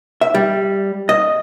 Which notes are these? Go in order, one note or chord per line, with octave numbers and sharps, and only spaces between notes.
E5
G3
D#5